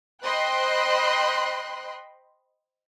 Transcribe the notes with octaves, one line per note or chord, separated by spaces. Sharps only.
C5 D#5 G5 B5 C6 F#6